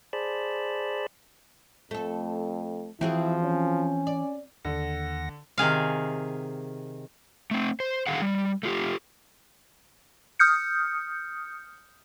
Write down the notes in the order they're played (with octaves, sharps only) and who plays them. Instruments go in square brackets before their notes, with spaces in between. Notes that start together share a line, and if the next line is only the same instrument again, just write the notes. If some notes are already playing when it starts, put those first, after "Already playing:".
[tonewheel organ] G#4 C5 D5 A5 B5
[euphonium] F2 [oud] A3 A4
[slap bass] E3 [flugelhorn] F3 [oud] C4 F#4 G#4 [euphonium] E4
[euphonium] C#4
[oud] D5
[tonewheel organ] D#2 F#5 A#6 [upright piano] D3
[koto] C3 D#3 G#4 F5
[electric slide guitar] A3 C4
C5
D3 D#3 G#4 F5 F#5
G3
A3 F4 G4
[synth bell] D#6 F6 G6 C#7